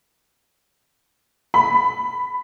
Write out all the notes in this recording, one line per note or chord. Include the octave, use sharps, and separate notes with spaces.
B5